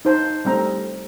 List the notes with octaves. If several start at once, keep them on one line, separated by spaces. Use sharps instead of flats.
D#4 C5 A5
G3 A3 C4 A#5